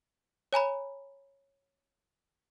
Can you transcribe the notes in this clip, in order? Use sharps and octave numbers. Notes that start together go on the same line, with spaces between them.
C#5 G#5 A#5 B5